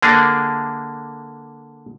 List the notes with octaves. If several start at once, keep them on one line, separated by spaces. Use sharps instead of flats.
D3 A#3 D4 G#4